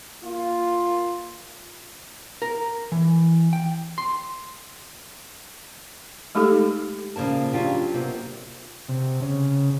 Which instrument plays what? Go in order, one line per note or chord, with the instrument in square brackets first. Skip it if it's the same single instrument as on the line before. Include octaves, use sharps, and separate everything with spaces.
[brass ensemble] A#3 F4
[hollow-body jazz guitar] A#4
E3
G5
C6
[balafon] G#3 A3 D#4 G4 A4
[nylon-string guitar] A#2 C#3 F3 A#3 A5
F#3 C#4 D4 F4 G4
C3 A#3 B3
[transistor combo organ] C3
C#3